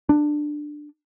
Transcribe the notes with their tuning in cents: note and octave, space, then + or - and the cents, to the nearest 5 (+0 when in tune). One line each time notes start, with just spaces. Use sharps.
D4 +15